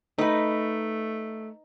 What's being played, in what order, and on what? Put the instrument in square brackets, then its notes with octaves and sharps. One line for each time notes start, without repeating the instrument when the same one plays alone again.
[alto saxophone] A3 [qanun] D#4 B4